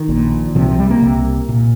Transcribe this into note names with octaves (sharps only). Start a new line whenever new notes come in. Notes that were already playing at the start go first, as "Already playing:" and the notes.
Already playing: D#3
A#1 A#2
C2 C3 F3
F3
G3
A#3
C2 C3
A#2